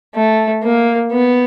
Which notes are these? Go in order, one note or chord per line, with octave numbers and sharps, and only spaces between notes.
A3
A#3
B3